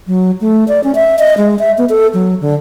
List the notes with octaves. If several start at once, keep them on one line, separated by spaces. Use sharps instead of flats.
F#3
A3
D5
C#4
E5
D#5
G#3
E5
B3
A4
F#3
D3